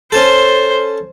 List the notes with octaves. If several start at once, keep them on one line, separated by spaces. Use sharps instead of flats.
C#4 A4 C5